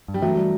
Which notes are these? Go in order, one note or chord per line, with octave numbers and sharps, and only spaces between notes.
G2
G3
E3 F#3 A3
G3